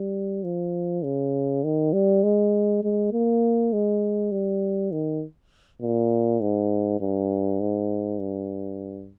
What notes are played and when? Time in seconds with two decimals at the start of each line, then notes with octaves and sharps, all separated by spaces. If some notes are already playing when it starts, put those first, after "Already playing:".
Already playing: G3
0.44 F3
1.04 C#3
1.64 D#3
1.93 G3
2.24 G#3
2.84 G#3
3.12 A#3
3.73 G#3
4.32 G3
4.92 D#3
5.82 A#2
6.41 G#2
7.01 G2
7.60 G#2
8.19 G2